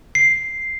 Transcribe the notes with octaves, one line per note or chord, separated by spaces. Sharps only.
C7